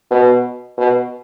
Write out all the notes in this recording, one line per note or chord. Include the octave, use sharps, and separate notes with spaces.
B2
B2